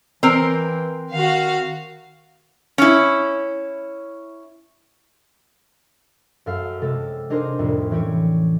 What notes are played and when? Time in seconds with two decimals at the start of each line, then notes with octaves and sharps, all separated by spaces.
0.23 E3 C4 A#4
1.12 D#3 F#4 F5
2.78 C#4 E4
6.46 F#2 A4 F5
6.81 C3 G#3 A4
7.30 D4 D#4 G#4 A#4 C5
7.59 C2 F2 A2
7.91 E3 C#4 G4 C#5